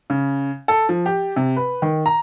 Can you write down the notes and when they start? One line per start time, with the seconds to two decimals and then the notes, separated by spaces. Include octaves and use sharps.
0.10 C#3
0.68 A4
0.89 F3
1.06 G4
1.36 C3
1.56 B4
1.82 D#3
2.06 A#5